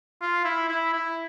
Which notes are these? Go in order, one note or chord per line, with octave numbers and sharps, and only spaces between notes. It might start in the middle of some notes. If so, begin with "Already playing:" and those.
F4
E4
E4
E4